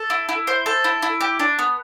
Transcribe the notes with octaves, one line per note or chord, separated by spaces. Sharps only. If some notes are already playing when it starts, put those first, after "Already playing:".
Already playing: A4
E4
E4
C5
A4
E4
E4
G4
D4
B3